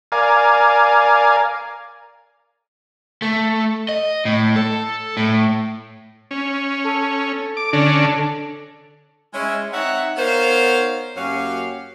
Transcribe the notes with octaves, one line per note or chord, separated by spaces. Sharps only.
A#4 D5 F5 G#5
A3
D#5
A2
A4
A2
C#4
A4
D6
D3 C#4 D4 A#6
A4
G#3 C#4 E4
C4 D#4 C#5 E5 F#5 A#5
B3 D#4 A#4 C5 C#5 F5
F#2 A#3 C#4 F#4 G4 F5